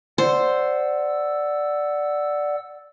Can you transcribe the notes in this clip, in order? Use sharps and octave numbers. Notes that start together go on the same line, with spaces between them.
C5 D5 F#5 E6